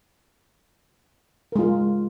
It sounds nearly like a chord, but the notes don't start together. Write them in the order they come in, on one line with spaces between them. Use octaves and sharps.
A#4 G#3 F4